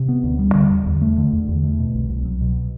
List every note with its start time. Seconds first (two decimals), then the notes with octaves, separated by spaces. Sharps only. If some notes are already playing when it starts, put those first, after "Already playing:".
Already playing: C3
0.08 B3
0.24 D2
0.39 G3
0.55 D3
0.71 E2
0.86 E2
1.01 A3
1.17 D3
1.33 E2
1.48 E2
1.64 A3
1.79 B2
1.95 C2
2.09 C2
2.25 F#3
2.41 B2